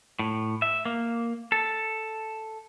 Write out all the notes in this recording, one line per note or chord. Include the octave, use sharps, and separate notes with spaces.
A2
E5
A#3
A4